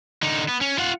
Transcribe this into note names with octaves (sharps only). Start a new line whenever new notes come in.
D3 D#4
B3
C#4
F4 F#5